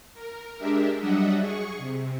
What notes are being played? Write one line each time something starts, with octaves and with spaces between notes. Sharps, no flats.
A#4
G#3 D4 G4 A#4 E5
F#3 G3 D4 D#5 E5 F#5
G#4 C#6
C3